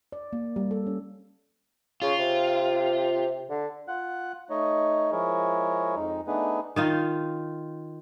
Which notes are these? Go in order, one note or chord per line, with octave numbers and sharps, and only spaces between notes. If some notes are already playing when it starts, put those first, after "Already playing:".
D5
A#3
G3
A4
C#4
C#3 F4
C3
D3
F4 F#5 F#6
A3 D#4 C#5 D#5
F3 G#3 E4 G#4 A#4 C#5
F2 G#3 D#4
A3 B3 D4 D#4 G#4 B4
D#3 D#4 F4